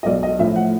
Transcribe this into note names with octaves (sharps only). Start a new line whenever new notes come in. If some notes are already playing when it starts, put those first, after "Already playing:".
D#5
B1 D5
D#5
A2 F3 E5
F#5